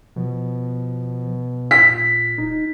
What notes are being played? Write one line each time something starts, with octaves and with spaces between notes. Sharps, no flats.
B2 F3
A#2 B6
D#1 D#4